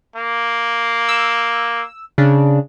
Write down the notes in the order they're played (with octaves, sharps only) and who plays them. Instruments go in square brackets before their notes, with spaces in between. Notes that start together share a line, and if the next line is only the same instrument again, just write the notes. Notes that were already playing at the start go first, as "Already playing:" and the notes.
[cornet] A#3
[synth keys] E6
C#3 D4